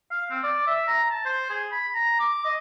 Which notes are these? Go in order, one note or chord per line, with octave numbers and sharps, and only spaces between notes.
F5
C4
D5
E5
A#5
A5
C5
G#4
B5
A#5
D6
D#5